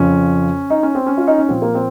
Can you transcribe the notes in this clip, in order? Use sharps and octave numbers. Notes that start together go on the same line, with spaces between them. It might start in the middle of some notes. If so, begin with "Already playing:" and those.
Already playing: F2 C#3 F3 C#4
D#4
C#4
C4
C#4
F4
D#4
C#4
A#2 F3 C4
A#3
C4